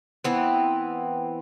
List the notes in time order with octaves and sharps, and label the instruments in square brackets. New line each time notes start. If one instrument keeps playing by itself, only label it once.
[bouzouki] E3 B3 C4